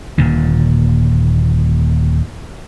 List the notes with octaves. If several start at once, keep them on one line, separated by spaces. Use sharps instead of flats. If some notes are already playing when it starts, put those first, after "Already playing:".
D#1 A#2 D3